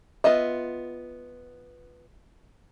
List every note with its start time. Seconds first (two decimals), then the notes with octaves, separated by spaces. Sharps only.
0.24 B3 F4 D#5 E5